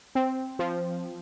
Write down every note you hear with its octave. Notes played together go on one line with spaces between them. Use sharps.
C4
F3